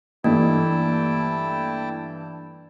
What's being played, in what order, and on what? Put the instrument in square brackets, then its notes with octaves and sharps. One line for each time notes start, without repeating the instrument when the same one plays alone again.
[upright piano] G2 E3 A3 [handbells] A#3 [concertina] E4 G5 A5